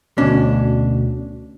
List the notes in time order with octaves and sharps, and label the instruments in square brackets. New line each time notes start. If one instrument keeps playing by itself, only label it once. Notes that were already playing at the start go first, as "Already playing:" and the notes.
[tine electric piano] D2 B2 [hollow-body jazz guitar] C#4 D4